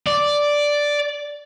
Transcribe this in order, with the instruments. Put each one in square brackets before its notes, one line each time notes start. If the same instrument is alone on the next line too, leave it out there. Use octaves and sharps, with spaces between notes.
[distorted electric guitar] D5